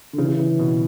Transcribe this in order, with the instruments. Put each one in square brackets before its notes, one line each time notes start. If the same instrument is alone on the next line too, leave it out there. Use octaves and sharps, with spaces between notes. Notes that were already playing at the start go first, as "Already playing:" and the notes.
[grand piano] D3
[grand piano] C#3 [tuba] E3
[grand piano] C#3
C#3
B2